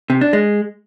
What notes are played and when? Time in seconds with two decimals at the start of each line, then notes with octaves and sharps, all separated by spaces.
0.10 C3
0.21 D4
0.33 G#3